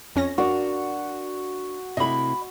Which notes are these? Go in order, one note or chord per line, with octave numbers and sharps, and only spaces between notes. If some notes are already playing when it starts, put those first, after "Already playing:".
F2 C#4 A#6
D4 F#4 A#4 D5
C3 A3 E4 D#5 B5